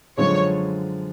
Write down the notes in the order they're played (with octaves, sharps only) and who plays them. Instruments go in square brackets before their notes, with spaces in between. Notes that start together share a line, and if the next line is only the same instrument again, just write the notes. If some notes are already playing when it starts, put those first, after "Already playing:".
[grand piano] F#2 D3 F3 G#3 [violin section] C#5